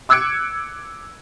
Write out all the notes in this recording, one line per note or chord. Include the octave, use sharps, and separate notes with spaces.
D6 E6 F#6 G#6 C#7 D7